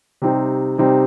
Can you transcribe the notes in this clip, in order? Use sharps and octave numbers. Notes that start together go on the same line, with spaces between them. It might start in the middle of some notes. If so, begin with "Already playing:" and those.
C3 G3 C4 D#4
C3 G3 C4 D#4